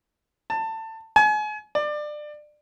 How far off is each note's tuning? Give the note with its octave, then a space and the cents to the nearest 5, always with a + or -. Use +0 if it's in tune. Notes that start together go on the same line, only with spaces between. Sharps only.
A5 +20
G#5 +35
D5 +25